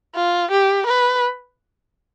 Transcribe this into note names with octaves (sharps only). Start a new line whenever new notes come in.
F4
G4
B4